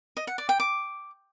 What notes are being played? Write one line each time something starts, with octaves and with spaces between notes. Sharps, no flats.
D#5
F#5
D5
G5
D6